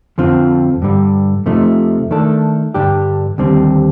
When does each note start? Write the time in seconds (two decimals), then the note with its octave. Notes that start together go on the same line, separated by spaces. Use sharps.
0.18 F2 D3 F3 C4 F4
0.82 G2 D3 G3
1.46 F2 C3 F3 A3 D#4
2.11 D#3 A3 D4 A4
2.74 G2 D3 G3 D4 G4
3.38 D#2 D3 G3 C4